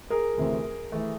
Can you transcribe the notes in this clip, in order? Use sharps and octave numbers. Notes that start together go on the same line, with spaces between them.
G#4 A#4
D2 C3 E3 A3 C4
E3 A3